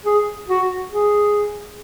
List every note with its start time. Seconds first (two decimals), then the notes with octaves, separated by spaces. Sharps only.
0.05 G#4
0.48 F#4
0.91 G#4